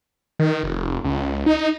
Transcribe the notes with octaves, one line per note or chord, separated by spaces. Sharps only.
D#3
F1
C#2
D#4